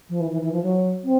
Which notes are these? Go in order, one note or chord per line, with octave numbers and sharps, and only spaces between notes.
F3
E3
E3
E3
F3
F#3
C4